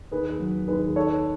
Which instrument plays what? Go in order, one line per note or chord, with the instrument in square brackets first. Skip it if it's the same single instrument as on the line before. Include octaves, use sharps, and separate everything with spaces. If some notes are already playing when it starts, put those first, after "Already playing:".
[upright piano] D#2 G#4 B4
F#3
D#2 G#4 B4
D#4 A4 C#5